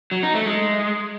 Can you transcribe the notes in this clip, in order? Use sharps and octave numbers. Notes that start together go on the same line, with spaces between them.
F#3
D#4
A3
G#3